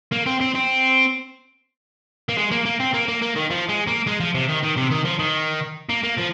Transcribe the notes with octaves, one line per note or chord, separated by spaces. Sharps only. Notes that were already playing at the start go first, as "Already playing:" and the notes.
A#3
C4
C4
C4
A#3
G#3
A#3
A#3
C4
A#3
A#3
A#3
D#3
F3
G#3
A#3
G#3
F3
C3
D#3
D#3
C3
D#3
F3
D#3
A#3
A#3
F3